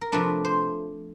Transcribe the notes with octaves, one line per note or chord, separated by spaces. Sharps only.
A#4
C3 F3 A3 D4 B4
C5